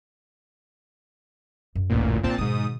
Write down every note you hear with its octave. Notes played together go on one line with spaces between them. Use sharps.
F#2
A1 D2 A#2
A#2 C4 D4 D#4 A5
G#2 B2 D#3 D#6